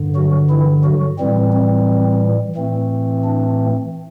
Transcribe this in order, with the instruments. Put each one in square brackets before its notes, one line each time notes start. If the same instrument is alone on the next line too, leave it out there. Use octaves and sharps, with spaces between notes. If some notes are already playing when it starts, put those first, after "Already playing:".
Already playing: [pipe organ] G2 D3
F#3 F#4
E3 E4
F#3 F#4
A2 E3 G3 C4
C4
A2 E3 A3 C4
D4